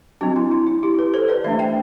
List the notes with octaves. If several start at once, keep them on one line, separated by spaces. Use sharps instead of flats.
F#3 C4 D4 F#4
E4
E4
E4
E4 G4
G4 B4
A4 C5
B4 D5
E3 A3 D4 C5 E5
E5 G5